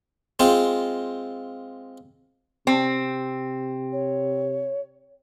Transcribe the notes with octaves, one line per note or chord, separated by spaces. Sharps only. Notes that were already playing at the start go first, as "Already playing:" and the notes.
G#3 C4 F4
C3 C4
C#5